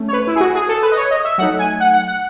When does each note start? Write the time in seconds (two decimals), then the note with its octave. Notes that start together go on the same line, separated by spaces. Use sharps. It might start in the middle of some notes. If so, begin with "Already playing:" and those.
Already playing: A3 C#4
0.08 C#5
0.13 B4
0.27 E4
0.36 G#4
0.41 F#4
0.55 G#4
0.69 A4
0.83 B4
0.92 D#5
0.97 C#5
1.11 D#5
1.25 E5
1.38 F#3 A3 D#4 F#5
1.59 G#5
1.80 F#5
1.93 F#5
2.08 F#5